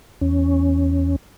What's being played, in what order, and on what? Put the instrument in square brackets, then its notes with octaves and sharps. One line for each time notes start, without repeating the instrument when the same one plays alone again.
[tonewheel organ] E2 C#4